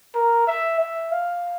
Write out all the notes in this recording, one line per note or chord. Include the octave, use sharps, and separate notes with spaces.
A#4
E5
E5
F5